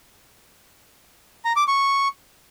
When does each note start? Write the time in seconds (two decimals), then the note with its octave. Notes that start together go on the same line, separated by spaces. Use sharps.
1.45 A#5
1.56 D6
1.68 C#6